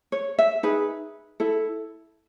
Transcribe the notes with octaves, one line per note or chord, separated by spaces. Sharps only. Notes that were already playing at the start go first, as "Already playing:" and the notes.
C#5
E5
D#4 G#4 B4
E4 A4